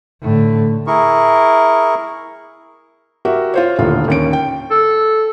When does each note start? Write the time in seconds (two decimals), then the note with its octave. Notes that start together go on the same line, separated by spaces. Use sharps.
0.22 A2 D3
0.87 E4 G#4 A#4 C#6
3.25 F#4 G4 A#4 E5
3.54 F4 C5 C#5
3.78 D#1 A2 D3 F4
4.08 D#2 C#4 D7
4.33 G5
4.71 A4